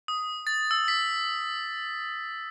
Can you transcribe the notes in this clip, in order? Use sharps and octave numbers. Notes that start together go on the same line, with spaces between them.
D#6
A6
E6
B6